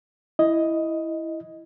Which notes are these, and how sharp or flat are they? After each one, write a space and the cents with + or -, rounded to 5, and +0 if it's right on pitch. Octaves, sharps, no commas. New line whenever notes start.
E4 +0 D#5 +5